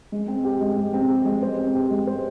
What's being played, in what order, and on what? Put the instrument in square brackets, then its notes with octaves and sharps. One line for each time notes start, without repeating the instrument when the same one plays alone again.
[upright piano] G#3
C4
G4
G#3
G#3
C4
G4
G#3
C5
C4
G4
G#3
C5